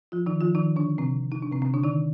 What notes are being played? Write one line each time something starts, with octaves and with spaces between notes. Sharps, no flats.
F3 F4
D#3 D#4
F3 F4
D#3 D#4
D3 D4
C3 C4
D#4
D4
C3 C4
C3 C4
D3 D4
D#3 D#4